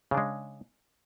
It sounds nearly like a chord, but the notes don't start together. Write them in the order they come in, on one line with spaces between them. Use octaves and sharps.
C#3 D4 G#3